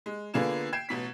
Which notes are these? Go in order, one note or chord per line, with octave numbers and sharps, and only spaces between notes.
G#3
D3 A#3 B3 F4 G#4 E7
G5 G#6 C7 E7
A1 B2 B6